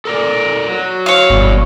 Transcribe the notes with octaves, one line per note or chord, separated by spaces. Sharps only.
A4 A#4 D5
F#3
C#5 F5
G1 G2 B2 E3